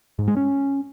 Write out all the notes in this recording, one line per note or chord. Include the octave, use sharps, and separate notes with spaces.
G#2
G#3
C#4